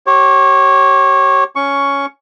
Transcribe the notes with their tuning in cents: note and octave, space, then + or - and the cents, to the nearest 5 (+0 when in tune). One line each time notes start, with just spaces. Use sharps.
G4 -35 C#5 -25
C#4 +10 C#6 +5